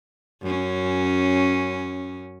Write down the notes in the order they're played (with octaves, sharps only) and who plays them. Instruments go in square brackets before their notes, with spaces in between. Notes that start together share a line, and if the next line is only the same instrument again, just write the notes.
[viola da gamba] F#2 C#4